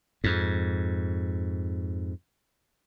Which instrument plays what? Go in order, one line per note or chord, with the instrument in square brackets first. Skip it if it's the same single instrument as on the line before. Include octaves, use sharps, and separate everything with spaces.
[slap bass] F2 G#2